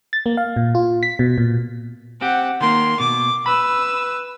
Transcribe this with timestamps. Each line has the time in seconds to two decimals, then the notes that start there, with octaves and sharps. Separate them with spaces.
0.13 A6
0.26 A#3
0.37 F5
0.56 A#2
0.75 F4
1.03 B6
1.19 B2
1.38 A#2
2.21 C4 G4 F#5
2.61 D#3 A#3 C6
3.00 B2 D6
3.46 B4 B5 E6